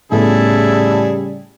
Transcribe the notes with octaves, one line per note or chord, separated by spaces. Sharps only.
A2 C#3 G3 A3 B3 E4 G#4 A4